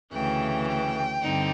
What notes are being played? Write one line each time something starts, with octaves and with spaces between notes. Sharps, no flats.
D2 C#3 E3 G5
G5
G2 D3 G3 C4 D#4